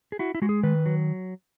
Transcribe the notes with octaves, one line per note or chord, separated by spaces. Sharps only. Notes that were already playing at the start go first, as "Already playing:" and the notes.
G#4
E4 F#4
E4
G#3 F#4
G#4
D#3 B4
F#3